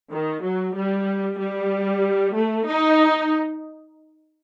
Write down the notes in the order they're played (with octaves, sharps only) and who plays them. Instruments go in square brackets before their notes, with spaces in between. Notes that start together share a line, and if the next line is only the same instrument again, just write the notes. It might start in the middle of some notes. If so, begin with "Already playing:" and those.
[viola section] D#3
F#3
G3
G3
A3
D#4